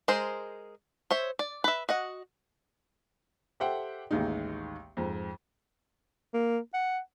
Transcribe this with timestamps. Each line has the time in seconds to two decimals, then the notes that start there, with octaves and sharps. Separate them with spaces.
0.08 G#3 G#4 A#4 C5
1.11 C5 C#5 E5
1.39 D5
1.64 B4 E5
1.89 F#4 D#5 F#5
3.60 G4 A4 C5 E5 F#5 G5
4.11 A1 D#2 D#3 G#3 D#4
4.97 F2 G#2
6.34 A#3
6.74 F#5